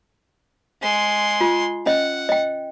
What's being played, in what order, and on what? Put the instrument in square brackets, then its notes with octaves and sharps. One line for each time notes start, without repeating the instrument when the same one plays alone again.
[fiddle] G#3 C6
[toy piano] F4
[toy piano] C#4 D#5 [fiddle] F#5
[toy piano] D#5 G5